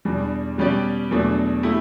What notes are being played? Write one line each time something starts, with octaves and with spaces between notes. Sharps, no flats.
E2 B2 G3 D4
B2 G3 C#4 G4 D5
E2 B2 F#3 A3 D4
A3 E4 G4